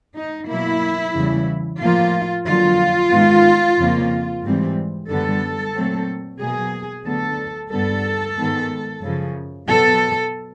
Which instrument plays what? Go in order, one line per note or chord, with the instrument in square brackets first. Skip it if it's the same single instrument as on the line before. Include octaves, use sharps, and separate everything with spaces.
[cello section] D#4
B2 F#3 A#3 E4
E2 C#3 E3 G3
A2 F3 A#3 F4
F2 D3 F#3 A#3 F4
G#2 D#3 G#3 B3
F2 C#3 F3 A#3
G#2 E3 G3 C4
F#2 D3 G3 B3 A4
A#2 F#3 A3 C4
B2 F#3 A#3 G#4
D2 D3 F#3 B3 A4
G2 D3 G3 B3 A4
G#2 D#3 G#3 B3
F#2 C#3 F3
B2 F#3 B3 A4